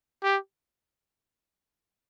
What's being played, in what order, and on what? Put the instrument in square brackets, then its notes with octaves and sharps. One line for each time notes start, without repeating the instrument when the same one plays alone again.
[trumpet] G4